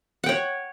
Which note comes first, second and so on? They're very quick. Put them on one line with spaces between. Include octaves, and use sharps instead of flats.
F#5 G5 C#5